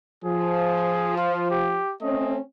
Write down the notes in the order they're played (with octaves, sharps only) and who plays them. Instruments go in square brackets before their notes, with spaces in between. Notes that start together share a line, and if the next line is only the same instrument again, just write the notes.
[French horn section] F3 [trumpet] G#4
[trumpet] F4
G4
[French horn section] A3 C4 C#4 [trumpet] D#5